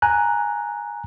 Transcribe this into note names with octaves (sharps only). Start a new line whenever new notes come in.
G#5 A#5 F#6